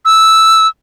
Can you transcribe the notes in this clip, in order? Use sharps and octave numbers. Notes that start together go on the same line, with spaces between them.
E6